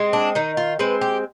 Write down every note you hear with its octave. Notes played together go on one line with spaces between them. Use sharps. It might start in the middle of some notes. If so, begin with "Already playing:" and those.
Already playing: G#3 C4
D4
D#3 D#4
F4
G#3 C4 B4
G4